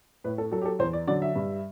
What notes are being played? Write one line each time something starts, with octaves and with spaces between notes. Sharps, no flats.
A2 B4
A4
F#3 A4
G4
A4
E2 C5
D5
D3 F#3 D5
E5
G2